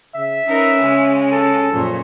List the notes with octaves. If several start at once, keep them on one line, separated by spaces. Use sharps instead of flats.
C#3 E5
C#4 D#4 A#4 B4
C#3 G#3
A4
F#2 A#2 C#3 F3